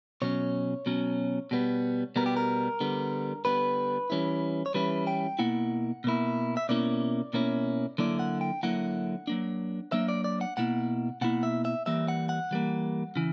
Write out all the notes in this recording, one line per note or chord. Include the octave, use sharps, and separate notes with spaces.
B2 F#3 C#4 C#5
B2 F#3 C#4
B2 G3 B3
B2 G3 B3 A#4
G4
A#4
D3 G3 B3
D3 G3 B3 B4
E3 G3 C#4 E4
C#5
E3 G3 C#4 E4 B4
G5
B2 A#3 E4 F#5
B2 A#3 E4
E5
B2 A#3 C#4 E4 D5
B2 A#3 C#4 E4
D3 F#3 A#3 E4 D5
F#5
G5
D3 F#3 A#3 E4 F#5
F#3 A#3 D4
F#3 A#3 D4 E5
D5
D5
F#5
B2 A#3 E4 F#5
B2 A#3 E4 F#5
E5
E5
E3 G3 A#3 E5
F#5
F#5
E3 G3 A#3
C#3 E3